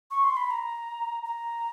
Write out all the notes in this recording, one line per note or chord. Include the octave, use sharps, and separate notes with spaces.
C#6
C6
B5
A#5
A#5